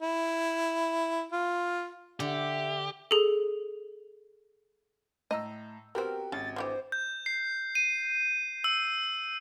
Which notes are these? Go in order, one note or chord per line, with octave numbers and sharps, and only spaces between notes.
E4
F4
D3 G4 E5
G#4 A4
A2 D#5 A#5 E6
B3 C4 F#4 G4 A#4
G#1 C#3 A6
D3 E3 G4 C5
G6
C7
D#7
E6